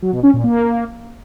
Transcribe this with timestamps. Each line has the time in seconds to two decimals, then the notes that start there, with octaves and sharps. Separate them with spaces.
0.02 F#3
0.13 B2
0.23 C#4
0.33 A#2
0.44 A#3